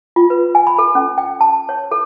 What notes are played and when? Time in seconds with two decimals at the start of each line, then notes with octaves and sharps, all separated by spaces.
0.16 F4
0.30 B4
0.55 G#5
0.67 B5
0.79 A4
0.95 C#4
1.18 G5
1.41 A5
1.69 C#5
1.92 A4